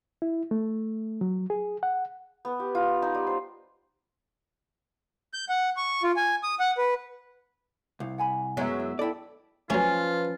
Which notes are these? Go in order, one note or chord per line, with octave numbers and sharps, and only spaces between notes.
E4
A3
F#3
G#4
F#5
B3
G4
F4
D#4
G3
C5
G6
F#5
C#6
F4
G#5
D#6
F#5
B4
C2 F5
F#5 G#5 B5
F#2 F#3 G#3 B3 E5
E4
D#4 E4 A4 B4 D5 G5
F3 F#3 A3 C#4 F4 B4